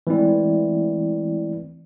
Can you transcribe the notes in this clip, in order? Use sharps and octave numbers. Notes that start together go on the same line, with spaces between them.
E3 G#3 A3 C4 E4 D5